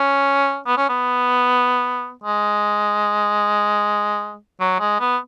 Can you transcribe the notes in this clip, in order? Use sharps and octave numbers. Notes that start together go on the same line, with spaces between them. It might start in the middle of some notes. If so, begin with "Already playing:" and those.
Already playing: C#4
B3
C#4
B3
G#3
F#3
G#3
B3